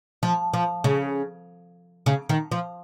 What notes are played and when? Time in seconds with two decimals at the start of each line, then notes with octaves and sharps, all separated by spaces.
0.23 F3
0.54 F3
0.84 C#3
2.06 C#3
2.29 D#3
2.52 F3